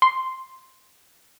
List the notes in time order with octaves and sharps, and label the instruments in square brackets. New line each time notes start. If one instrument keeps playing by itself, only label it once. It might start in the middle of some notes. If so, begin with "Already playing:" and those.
[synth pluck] C6